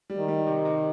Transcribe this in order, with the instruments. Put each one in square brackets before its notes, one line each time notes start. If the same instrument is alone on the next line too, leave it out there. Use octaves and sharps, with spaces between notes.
[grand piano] G3
[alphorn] D#3
[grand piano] G3
C3
C3